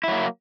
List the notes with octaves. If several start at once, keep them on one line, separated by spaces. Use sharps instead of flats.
F#3 A#3 E4